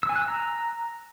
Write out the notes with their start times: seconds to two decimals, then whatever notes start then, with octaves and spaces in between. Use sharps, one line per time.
0.03 E6
0.09 G#5
0.16 F#6
0.22 E6
0.28 A#5